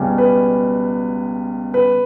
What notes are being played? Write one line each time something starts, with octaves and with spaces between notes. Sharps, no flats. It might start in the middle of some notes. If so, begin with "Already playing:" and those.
Already playing: C#2 B2 G3 C#4
B4
B4